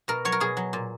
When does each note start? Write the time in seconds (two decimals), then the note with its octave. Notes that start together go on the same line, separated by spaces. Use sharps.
0.08 B2 A#4
0.25 F#3 C#5
0.32 A#4
0.40 B2 G#4
0.57 F#3
0.73 A#2